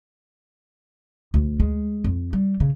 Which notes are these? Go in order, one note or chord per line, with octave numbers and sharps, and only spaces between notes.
D2
G#3
F2
G3
C#3